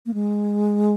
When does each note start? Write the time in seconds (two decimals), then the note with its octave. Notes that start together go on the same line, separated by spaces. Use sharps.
0.06 A#3
0.14 G#3